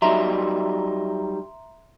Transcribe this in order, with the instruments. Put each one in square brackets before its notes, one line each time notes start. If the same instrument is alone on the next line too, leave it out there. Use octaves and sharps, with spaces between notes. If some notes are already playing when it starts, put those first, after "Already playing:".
[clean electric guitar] F#3 G3 D#4 [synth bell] E5 A#5 C6